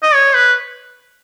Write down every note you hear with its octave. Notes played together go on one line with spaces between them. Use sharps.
D#5
C#5
B4